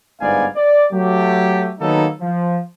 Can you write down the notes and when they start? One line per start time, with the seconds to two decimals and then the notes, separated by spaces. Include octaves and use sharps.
0.21 G1 G#2 B3 D5 F5 G#5
0.56 D5
0.92 F#3 A3 G4
1.81 D#3 F#3 A#3 B3 D#4 A4
2.20 F3